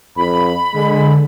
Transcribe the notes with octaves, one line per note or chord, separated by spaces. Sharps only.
F2 B5
D3 G#3